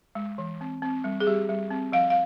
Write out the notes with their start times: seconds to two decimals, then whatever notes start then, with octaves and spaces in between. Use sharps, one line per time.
0.15 G#3
0.38 E3
0.61 C4
0.82 C4
1.04 G3
1.20 G#4
1.27 G3 G4
1.49 G3
1.71 C4
1.92 F3 F5
2.10 F5